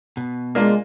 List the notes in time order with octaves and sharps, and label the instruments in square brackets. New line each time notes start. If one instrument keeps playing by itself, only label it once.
[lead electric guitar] B2
[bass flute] G#3 [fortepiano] A#3 D4 F4